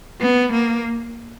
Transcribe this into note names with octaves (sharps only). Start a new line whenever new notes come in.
B3
A#3